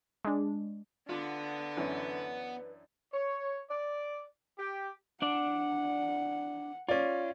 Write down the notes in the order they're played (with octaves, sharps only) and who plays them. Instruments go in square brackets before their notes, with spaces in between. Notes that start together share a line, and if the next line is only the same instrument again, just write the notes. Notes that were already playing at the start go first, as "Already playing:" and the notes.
[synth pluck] G#3 D4
[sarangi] D3 [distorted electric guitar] B3 [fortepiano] D4 F4
[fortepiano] F#2 E3 C#4 [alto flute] B4
[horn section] C#5
D5
G4
[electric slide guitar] D4 D5 [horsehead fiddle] F#5
[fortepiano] C#4 D5 [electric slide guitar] F4